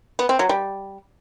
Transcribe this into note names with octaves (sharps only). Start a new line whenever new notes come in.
B3
C4
F#3
G3